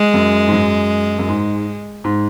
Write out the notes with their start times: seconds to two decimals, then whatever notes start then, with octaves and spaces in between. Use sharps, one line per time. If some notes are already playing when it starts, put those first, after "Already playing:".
Already playing: G#3
0.14 F#2
0.48 G#2
0.53 F#2
1.19 F#2
1.29 G#2
2.04 G#2